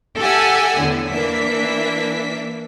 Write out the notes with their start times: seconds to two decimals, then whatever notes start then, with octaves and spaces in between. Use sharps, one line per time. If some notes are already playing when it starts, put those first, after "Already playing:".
0.19 G4 A4 E5 F#5 G#5 E6
0.78 E2 A2 D3
1.10 E3 A#3 D4 E5 B6